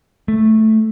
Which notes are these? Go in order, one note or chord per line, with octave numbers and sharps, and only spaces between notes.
A3